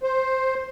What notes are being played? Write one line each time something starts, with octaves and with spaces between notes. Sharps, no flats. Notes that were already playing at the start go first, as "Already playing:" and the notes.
C5